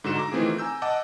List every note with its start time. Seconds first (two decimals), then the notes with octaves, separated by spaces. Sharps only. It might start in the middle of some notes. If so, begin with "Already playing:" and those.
0.04 G#2 D3 F#4 E7
0.16 A#5 D6
0.32 D#3 E3 A3 C4 F4 G#4
0.58 G#5 A#5 E6 G6
0.82 D#5 F#5 A5 D6 E6